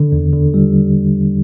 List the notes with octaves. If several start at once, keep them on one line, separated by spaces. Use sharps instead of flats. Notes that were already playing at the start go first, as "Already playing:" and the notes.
Already playing: D3
E2
D3
G3